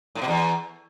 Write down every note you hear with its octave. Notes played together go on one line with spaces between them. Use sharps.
A2
B2
E2